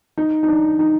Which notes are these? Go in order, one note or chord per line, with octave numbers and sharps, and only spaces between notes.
D#4
D#4
D4
D#4